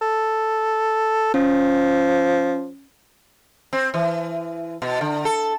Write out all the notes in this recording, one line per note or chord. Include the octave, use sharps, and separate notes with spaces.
A4
F3 C#4
C4
E3
B2
D3
A4